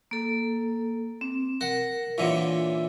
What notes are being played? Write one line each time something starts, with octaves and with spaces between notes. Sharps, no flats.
A#3 A4
C4
A#4 F#5
A#2 D3 E3 C#5